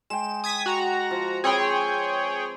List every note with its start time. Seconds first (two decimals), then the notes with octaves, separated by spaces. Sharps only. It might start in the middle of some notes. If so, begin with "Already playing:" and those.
0.10 G#3 G5 E7
0.44 D#6 G#6 B6
0.66 F#4 A#5
1.11 F3
1.44 C4 G#4 B4 C#5 G5